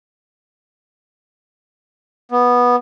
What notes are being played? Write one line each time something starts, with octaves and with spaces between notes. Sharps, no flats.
B3